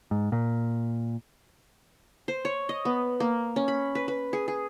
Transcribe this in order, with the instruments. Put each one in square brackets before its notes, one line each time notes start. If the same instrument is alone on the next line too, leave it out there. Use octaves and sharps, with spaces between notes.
[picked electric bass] G#2
A#2
[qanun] C5
C#5
D#5
B3
A#3
C#4
B5
B4
B4
G#4
G#4